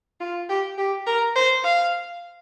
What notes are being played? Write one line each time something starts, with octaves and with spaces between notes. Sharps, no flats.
F4
G4
G4
A#4
C5
F5